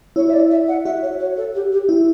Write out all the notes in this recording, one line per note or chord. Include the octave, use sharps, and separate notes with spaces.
E4 C#5
E5
D5
E5
F#5
F#4 E5
C#5
C#5
A4
G4
G4
E4